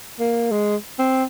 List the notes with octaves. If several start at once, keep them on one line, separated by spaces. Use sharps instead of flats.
A#3
G#3
C4